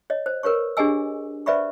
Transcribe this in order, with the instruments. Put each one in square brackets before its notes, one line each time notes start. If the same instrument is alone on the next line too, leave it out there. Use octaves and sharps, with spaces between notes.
[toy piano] C#5 D#5
C5
A#4 B4 C#5 C#6
D4 G4 G#4 D#5 G#5 E6
B4 C5 D5 E5 B5 C#6